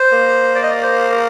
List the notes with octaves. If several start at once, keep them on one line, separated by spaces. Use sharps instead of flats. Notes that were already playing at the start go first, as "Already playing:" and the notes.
Already playing: C5
A#3
D5
D#5
D5
C5
A#4